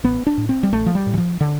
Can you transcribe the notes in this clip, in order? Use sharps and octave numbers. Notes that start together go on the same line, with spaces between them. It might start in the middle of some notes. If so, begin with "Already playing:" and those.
A1 B3
D4
A2
C4
G3
A1 A3
F3
G3
A2
E3
F3
D3